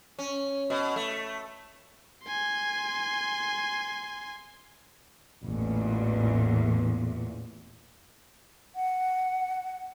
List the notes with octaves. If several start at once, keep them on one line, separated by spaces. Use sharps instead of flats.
C#4
B2
A3
G#5 C6
A1 E2 A#2
F#5